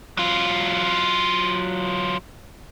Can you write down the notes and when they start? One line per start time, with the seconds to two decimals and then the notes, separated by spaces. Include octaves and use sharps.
0.17 F#3 F4